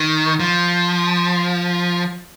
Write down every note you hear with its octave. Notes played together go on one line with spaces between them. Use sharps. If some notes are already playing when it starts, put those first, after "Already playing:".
Already playing: D#3
F3